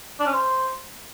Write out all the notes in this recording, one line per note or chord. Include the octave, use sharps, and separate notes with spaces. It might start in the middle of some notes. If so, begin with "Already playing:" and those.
D4
C#4
C5